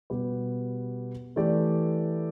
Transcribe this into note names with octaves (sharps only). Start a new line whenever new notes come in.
B2 G3 B3 G4 B4
E3 A3 G4 B4 D5